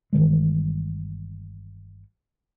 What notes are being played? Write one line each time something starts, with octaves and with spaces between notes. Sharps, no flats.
G1 D#3 E3 G#3